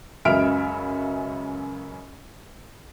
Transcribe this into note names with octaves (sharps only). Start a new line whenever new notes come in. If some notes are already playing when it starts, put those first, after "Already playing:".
C#2 F#2 C#3 E5 F6 D7